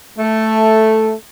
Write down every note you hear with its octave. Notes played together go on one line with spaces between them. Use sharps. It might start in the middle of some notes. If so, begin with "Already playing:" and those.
A3